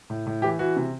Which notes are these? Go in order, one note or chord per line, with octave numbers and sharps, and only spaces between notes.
A2
A2
E3 G4
E3 F#4
C3